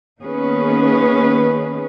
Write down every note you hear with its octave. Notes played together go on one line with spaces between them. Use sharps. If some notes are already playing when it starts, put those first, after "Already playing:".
D#3 A#3 B3 C#4 G#4 B4